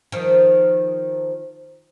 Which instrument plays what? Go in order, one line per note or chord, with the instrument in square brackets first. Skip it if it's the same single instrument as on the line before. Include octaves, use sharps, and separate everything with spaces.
[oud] D#3 F3